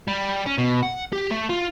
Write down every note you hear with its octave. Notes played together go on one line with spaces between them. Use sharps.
G3
C#4
B2
F#5
G4
A3
F4